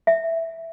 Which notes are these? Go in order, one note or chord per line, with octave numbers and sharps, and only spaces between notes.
E5